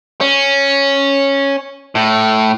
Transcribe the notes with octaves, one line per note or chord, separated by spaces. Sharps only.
C#4
A2